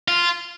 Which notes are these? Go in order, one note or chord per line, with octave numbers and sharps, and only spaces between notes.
F4